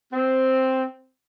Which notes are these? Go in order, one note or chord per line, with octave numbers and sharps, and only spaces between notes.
C4